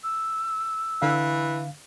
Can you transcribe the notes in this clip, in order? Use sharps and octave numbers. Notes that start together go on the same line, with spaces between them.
E6
D3 E3 F5